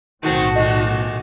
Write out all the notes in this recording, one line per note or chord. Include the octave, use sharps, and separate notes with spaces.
B1 A2 D#3 A3 C4 F#4
A#2 D#3 D#5